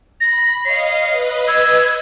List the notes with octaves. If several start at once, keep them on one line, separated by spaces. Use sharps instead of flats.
B5 A#6
C#5 D#5 F5 C7
B4 D#5
E6 G#6